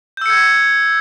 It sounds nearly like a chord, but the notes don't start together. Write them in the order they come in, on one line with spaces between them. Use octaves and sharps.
G6 E6 C#7 G#6